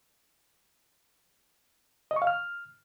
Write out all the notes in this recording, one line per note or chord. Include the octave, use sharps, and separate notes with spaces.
D#5
C#6
F5
F6